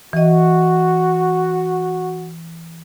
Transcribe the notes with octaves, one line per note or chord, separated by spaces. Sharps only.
E3 F#4 D#5